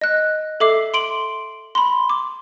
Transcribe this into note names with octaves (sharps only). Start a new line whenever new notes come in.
D#5 F#6
A4 E5 D6 C7
C6 D7 F#7
B5 C6
D6